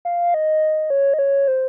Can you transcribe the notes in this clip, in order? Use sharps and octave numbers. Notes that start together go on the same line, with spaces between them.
F5
D#5
C#5
D#5
C#5
C5